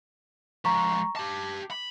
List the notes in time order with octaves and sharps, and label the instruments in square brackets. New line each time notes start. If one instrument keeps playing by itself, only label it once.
[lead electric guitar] F3 G#3 [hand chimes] A#5 C#6
[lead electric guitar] G4 A5 [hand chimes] D6
[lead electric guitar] B5